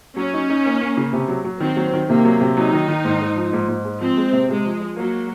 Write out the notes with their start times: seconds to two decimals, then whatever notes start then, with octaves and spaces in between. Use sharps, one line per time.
0.17 F#3 C#4
0.33 D#4
0.50 D#4
0.66 A#3
0.81 A#3
0.97 C#3
1.13 C3
1.28 F#3
1.44 F#3
1.60 D#3 C4
1.77 F#3
1.94 D#3
2.09 C3 A#3
2.25 F#3
2.41 C3
2.57 F#3 D#4
2.73 D#3
2.88 D#3
3.04 G#2
3.21 G#2
3.36 F3
3.53 G#2
3.68 G#2
3.85 G#3
4.01 F3 C4
4.17 G#3
4.32 C3
4.48 C3 G#3
4.65 F3
4.80 F3
4.96 F#3 A#3